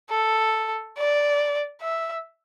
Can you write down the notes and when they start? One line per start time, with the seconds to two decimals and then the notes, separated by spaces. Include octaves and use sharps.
0.11 A4
0.97 D5
1.82 E5